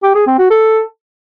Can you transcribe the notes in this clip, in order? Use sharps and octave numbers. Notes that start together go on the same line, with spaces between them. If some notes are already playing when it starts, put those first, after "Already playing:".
G4
G#4
C4
F#4
A4